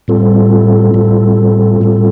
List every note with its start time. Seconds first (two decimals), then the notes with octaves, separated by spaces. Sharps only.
0.08 A2 G3 C4 F4 A4
0.94 A2 G3 C4 F4 A4
1.81 A2 G3 C4 F4 A4